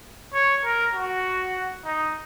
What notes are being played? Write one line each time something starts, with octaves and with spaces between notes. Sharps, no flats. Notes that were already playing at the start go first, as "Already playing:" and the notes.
C#5
A#4
F#4
D#4